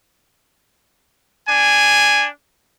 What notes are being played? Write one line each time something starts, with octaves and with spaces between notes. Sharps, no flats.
D4 G#5